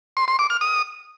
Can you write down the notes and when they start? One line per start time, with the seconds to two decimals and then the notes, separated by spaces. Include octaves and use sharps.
0.17 C6
0.28 C6
0.39 D6
0.50 F6
0.61 D#6